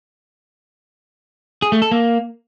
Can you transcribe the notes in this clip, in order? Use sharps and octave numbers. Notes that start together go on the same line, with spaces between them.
G#4
A3
A4
A#3